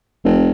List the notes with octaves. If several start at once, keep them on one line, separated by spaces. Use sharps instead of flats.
F1